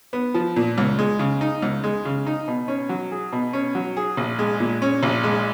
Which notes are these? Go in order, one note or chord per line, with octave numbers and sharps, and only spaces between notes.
B3
F3
A#2
C#2
G#3
C#3
D#4
C#2
G#3
C#3
D#4
B2
C#4
F#3
G#4
B2
C#4
F#3
G#4
A#1
G#3
A#2
C#4
A#1
G#3